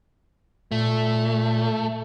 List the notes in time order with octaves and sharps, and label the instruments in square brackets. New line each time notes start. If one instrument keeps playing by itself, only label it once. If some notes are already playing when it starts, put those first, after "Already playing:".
[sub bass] A#2 [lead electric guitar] A3